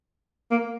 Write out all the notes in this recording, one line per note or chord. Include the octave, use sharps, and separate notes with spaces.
A#3